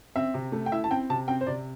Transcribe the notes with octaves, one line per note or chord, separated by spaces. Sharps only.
C4 E5
C3
A3
G5
E4 E5
A5
C4 G5
C3 A5
C4 G5
C5
C3 D5